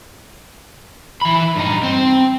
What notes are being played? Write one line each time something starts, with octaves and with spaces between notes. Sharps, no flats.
E3 B5
G2 D#4
C4 G5